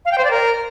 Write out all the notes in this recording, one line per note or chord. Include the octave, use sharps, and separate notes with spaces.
F5
G5
C5
D5
A#4